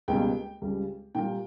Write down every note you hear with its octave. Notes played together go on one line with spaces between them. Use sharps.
C#2 B2 G3 A#3 G5
C#2 C#3 G3
A#2 G3 A#3 G5